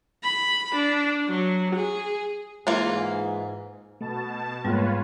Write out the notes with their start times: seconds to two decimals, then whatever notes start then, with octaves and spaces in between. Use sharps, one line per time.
0.24 B5
0.76 D4
1.28 F#3
1.76 G#4
2.67 G#2 E3 A#3 F4
4.01 B2 A3 A5
4.65 G#2 G3 A#3 B3 F4 B4 C#5